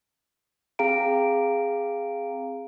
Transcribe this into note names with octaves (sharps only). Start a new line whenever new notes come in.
C4 G#4 F5 G5 A#5 D7